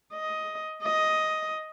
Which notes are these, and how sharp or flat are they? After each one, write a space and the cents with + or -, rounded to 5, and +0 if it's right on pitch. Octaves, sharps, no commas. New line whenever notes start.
D#5 +10
D#5 +10